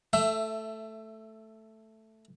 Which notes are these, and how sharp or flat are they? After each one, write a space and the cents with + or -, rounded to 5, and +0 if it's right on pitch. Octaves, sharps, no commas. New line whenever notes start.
A3 +0 E5 +20